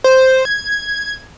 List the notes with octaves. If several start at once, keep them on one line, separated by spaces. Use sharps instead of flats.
C5
G#6